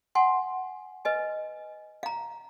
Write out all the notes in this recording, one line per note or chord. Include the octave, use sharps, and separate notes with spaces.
F#5 G#5 C6
B4 D#5 G#5
F5 A#5